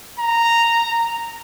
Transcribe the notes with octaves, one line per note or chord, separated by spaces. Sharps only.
A#5